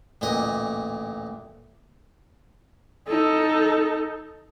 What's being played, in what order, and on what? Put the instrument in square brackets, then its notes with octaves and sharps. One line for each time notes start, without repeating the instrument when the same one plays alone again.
[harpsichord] A1 D2 A#2 D#5
[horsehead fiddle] D#4 A4